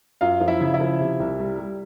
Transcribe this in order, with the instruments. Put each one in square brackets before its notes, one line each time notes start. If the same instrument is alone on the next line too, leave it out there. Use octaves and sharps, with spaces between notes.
[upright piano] F#2 F4 F5
F3
E4 E5
C#3
E4 E5
F3
C3
C2
G3
G3